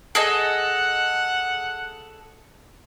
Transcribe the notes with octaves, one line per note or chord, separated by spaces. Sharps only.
G#4 A4 D#5 F#5